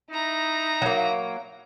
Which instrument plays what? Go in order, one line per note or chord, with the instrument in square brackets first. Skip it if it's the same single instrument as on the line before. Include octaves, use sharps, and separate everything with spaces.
[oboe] D#4 [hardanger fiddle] E4 A#5
[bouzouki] F#3 A#3